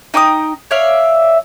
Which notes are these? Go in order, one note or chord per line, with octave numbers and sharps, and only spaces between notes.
D#4 G5 C#6 D#6
C#5 D5 E5 F5